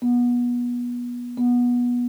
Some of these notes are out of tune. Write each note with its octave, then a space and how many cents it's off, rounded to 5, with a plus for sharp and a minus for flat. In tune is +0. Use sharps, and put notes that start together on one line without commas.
B3 -25
B3 -20